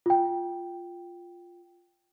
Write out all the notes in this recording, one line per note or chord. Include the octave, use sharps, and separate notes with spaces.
F4 G5